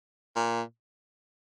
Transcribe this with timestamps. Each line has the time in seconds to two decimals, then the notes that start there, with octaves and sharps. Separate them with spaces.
0.36 A#2